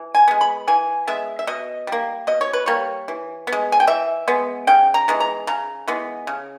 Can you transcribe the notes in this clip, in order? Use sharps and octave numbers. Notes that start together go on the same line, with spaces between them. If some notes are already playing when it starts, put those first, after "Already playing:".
Already playing: E3
G#5
G#3 B3
B5
E3 G#5
G#3 B3 E5
E5
B2 D#5
G3 A#3
B2 D#5
C#5
B4
G3 A#3 C#5
E3
B3
G#3
G#5
G5
E3 E5
G#3 B3
C#3 G5
A#5
E3 G#3 B3
A#5
C#3 A#5
E3 G#3 B3
C#3